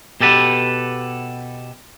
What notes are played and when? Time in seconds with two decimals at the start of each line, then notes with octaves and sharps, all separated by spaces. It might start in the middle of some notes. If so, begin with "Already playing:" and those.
0.21 B2 G4 A4 B4